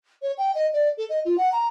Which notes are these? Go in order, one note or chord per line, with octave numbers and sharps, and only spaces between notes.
C#5
G5
D#5
D5
A4
D#5
F4
F#5
A#5